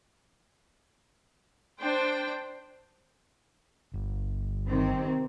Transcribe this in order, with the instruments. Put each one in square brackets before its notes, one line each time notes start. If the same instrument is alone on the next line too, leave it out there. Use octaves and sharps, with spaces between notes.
[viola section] D4 C5 G5
[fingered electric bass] G1
[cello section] C3 D#3 C4